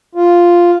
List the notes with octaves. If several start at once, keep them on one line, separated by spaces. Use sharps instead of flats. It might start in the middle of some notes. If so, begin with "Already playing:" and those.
F4